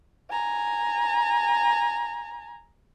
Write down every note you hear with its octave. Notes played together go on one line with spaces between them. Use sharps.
G#5 A#5